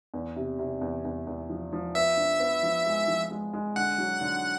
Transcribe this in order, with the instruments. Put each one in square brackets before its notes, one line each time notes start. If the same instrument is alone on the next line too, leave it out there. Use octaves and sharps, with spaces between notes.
[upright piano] E2
C3
C3
E2
E2
E2
F3
F3
[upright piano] B3 [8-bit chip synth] E5
[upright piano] D4
B3
F3
G#3
F3
G#3
G#3
[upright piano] D3 [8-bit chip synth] F#5
[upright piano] F#3
D3